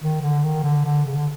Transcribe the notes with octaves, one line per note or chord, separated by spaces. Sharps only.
D#3
D3
D#3
D3
D3
C#3
D3